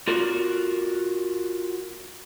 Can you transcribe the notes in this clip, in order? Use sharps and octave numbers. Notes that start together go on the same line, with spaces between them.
F4 F#4 A#4